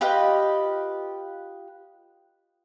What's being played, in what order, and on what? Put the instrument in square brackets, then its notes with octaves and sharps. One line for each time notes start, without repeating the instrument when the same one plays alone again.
[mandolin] F4 G4 B4 D#5